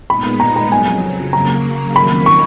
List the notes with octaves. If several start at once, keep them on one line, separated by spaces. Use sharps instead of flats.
A#2 G#3 B3 D#4 B5
A#5
A#5
F2 C#3 F#3 G#5
C#3 F#3 A#3 A#5
F2 D#3 F#3 A#3 C#4 B5
C#6